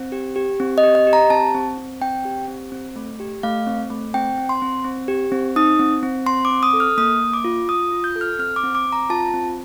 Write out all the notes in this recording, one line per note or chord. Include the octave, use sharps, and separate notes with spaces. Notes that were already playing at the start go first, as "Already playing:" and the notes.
Already playing: C4
G4
G4
C4
D#5
G4
D#5
G4
A#5
C4 A5
C4
C4
C4 G5
G4
C4
C4
A3
G4
A3 F5
C4
A3
C4 G5
C4
C6
C4
C4
G4
C4
D#4 D#6
C4
C4
C4 C6
D6
C4
D#6
A4
F6
A#3 D#6
A#3
D6
F4
F4 D#6
F4
G6
A4
F6
C4 F6
D6
C4
D6
C4
A#5
F4 A5
C4